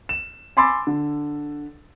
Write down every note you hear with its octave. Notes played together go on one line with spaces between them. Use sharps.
E7
G#5 B5 C6 D6 E6 A6
D3